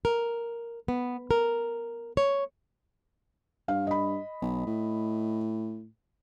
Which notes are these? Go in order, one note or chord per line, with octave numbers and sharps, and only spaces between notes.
A#4
B3
A#4
C#5
G2 F5
D#5 B5
B1
A2